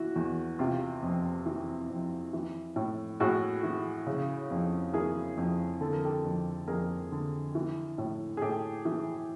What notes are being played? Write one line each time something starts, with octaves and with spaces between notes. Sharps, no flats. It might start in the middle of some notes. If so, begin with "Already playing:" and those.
Already playing: E3 E4 F#4
E2
C3 F4 G4
F2
E3
F2
E3
A2
A2 F#4 G#4
E3
C#3
F2
E3 G#4 A#4
F2
D3 A4
A#4
G4 A4
F2
F2 G#4 A#4
D3
E3
A2
G#4
A2 G4 A4
E3